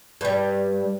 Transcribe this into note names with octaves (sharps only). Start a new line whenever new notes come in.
G2 G3